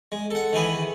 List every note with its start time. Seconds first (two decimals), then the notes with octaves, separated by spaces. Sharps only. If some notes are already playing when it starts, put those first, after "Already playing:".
0.12 G#3
0.31 A4 F#5
0.53 D#3 E3 G#4 B4